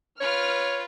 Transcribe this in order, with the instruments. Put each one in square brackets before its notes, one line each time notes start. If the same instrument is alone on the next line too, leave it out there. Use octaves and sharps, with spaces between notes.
[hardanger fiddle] F4 B4 [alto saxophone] C#5 [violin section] F6